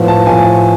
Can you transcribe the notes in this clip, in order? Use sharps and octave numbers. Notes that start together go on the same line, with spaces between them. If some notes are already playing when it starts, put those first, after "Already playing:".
Already playing: A2 F3 B3 F4
A5
A2 F3 B3 F4 G#5